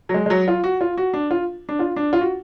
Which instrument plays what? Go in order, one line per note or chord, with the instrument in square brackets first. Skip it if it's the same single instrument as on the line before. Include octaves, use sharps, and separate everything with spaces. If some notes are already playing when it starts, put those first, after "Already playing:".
[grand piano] F#3
G#3
G#3
F#3
F4
F#4
F4
F#4
D4
F4
D4
F4
D4
F4
F#4